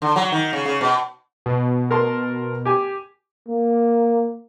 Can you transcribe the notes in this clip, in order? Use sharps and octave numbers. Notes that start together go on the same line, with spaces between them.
D3
F#3
D#3
C#3
C#3
B2
B2
A#4 A5 C6
G4 G#5
A#3